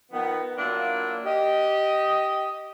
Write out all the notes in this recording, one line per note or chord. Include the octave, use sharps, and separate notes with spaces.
D#3 F3 B3
F#3 A#3 D4 E4 F4
G4 D#5